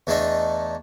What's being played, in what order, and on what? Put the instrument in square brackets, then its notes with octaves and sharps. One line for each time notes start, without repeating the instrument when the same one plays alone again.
[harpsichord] E2 A3 D4 D#4 D#5 C#6